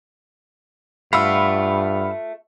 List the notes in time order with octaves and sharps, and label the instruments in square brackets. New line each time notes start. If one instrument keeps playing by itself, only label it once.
[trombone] G2 [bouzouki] A3 F4 [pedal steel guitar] F5 F#5 E6 [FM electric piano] B5